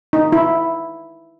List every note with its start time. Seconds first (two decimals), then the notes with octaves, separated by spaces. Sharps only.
0.13 D#4
0.32 E4